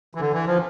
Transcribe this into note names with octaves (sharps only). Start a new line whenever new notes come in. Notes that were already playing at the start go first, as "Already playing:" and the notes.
E3
D3
E3
F3